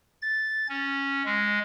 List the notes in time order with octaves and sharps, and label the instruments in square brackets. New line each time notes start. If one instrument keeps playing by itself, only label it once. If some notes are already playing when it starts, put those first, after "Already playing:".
[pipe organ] A6
C#4
G#3